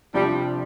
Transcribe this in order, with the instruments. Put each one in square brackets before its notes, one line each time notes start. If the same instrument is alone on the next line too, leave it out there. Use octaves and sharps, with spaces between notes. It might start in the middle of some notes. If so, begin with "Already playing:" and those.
[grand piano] C3 F3 D4 F4 [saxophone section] G3